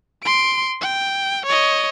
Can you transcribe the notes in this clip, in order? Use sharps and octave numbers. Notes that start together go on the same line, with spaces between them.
C6 D7
G5
C#5 D#5